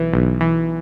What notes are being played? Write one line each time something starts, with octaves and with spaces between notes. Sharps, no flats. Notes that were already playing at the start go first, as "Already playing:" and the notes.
Already playing: B1 E3
B1
E3